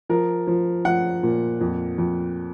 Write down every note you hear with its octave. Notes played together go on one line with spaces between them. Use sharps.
F3 A#4
F3
F3 F#5
A#2
F2
F2